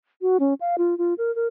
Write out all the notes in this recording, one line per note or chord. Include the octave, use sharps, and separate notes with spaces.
F#4
C#4
F5
F4
F4
A#4
A#4